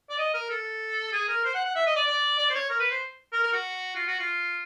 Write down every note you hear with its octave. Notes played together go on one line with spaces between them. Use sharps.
D5
D#5
A#4
A4
G#4
A#4
C5
F#5
F#5
E5
D#5
D5
D5
D5
C5
C#5
A#4
B4
C5
A#4
A#4
F#4
F4
F#4
F4